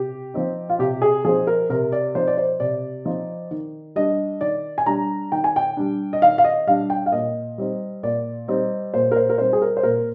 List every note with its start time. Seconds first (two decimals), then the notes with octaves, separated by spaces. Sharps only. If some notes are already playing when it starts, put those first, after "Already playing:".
Already playing: C3 G4
0.34 F3 C4 D#4
0.69 F4
0.79 C3 G4
1.02 G#4
1.25 F3 C4 D#4 G#4
1.47 A#4
1.70 C3 A#4
1.92 D5
2.15 F3 C4 D#4 C5
2.27 D5
2.37 C5
2.60 C3 D5
3.05 F3 C4 D#4
3.51 D#3
3.96 G3 D4 D#5
4.41 D#3 D5
4.78 G#5
4.86 G3 D4 A#5
5.32 D#3 G5
5.44 G#5
5.56 G5
5.77 G3 D4
6.13 D#5
6.22 D#3 F5
6.38 F5
6.44 D#5
6.67 G3 D4 F5
6.90 G5
7.06 F5
7.12 A#2 D#5
7.58 G3 C4 D#4
8.03 A#2 D5
8.48 G3 C4 D#4
8.94 A#2 C5
9.12 A#4
9.16 C5
9.29 A#4
9.38 G3 C4 D#4 C5
9.53 G#4
9.62 A#4
9.77 C5
9.83 A#2 A#4